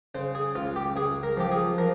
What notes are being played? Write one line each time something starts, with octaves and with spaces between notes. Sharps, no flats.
C#3 C5
G#4
C#2 F4
G4
C#2 G#4
A#4
F3 G4
G#4
F3 A#4